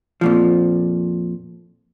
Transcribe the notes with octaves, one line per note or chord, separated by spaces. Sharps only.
F2 A#2 F3